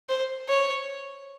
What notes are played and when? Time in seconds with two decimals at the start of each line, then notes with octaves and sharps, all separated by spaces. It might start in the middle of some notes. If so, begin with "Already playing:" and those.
0.09 C5
0.49 C#5